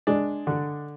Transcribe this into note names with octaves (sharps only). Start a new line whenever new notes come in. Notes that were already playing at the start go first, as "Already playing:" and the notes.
G#3 D4
D3